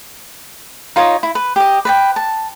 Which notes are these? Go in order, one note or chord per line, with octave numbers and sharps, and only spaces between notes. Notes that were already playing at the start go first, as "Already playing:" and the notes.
D#4 F4 C#5 D#5
E4
B4
G4 D#5
B4 D5 G5
A5